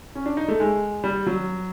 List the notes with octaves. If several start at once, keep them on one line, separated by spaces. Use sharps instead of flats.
C#4
D4
D#4
A3
G#3
G3
F#3